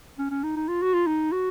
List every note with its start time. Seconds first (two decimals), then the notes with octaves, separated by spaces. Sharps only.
0.19 C#4
0.31 C#4
0.44 D#4
0.56 D#4
0.68 F4
0.82 F#4
0.94 F4
1.07 D#4
1.32 F#4